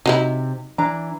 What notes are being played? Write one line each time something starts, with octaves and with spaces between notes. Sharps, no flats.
C3 F#3 D#4 E4
E3 D4 A#5